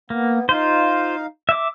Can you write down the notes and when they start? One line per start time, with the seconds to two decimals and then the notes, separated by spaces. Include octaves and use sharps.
0.10 A#3 B3
0.49 D#4 F4 C5 F5
1.49 E5 D6